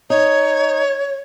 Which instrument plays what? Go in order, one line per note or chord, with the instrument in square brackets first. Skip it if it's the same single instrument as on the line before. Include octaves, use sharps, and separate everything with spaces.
[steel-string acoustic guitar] D#4 [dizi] C#5